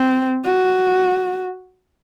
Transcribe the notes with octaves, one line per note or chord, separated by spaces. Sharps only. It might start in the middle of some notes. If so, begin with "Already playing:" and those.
Already playing: C4
F#4